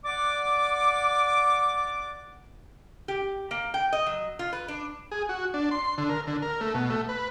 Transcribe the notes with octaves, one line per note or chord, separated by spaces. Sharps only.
D5 F#5 D6
G4
A#3
G5
D#5
F#3
F4
B4
D4
G#4
F#4
D4
C6
D3
A#4
D3
A#4
A3
B2
A3
B4